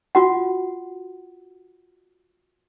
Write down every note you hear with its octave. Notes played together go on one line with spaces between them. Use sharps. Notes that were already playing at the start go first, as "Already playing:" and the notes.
F4 F#4 F#5